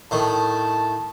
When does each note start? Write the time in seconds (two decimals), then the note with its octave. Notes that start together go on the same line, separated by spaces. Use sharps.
0.11 A2 D#3 A5